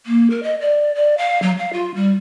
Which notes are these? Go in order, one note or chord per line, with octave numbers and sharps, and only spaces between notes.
A#3
A#4
D#5
D5
D5
F5
F#3
F5
F4
G3